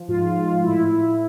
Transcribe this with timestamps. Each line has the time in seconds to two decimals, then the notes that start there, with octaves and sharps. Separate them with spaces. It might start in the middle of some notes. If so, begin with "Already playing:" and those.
Already playing: F3
0.08 G#2 F4
0.36 G#3 F4
0.64 A2 E4